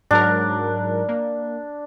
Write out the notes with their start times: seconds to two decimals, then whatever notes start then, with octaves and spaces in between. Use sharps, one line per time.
0.11 G#2 F#3 D4 A#4
1.09 A#3